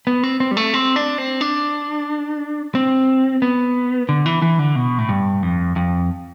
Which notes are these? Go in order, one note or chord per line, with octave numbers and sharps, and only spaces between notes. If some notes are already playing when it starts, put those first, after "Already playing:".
B3
C4
C4
G3
A3
C4
D4
C4
D4
C4
B3
D3
E3
E3
D3
B2
A2
G2
F2
F2